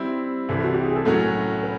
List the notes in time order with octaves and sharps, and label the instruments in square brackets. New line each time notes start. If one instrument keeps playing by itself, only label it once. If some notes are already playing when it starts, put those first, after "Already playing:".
Already playing: [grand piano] G3 C4 E4
[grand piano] C2 C3 E3 [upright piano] A4
[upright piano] F#4
G4
G#4
A4
[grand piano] A2 F#3 A3 C#4 F#4 [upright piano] A#4
[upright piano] B4